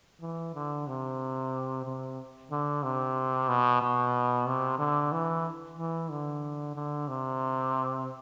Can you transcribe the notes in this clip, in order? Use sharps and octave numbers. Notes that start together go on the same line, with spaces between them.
E3
D3
C3
C3
D3
C3
B2
B2
C3
D3
E3
E3
D3
D3
C3